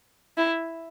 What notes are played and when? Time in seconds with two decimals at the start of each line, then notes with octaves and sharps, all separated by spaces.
0.38 E4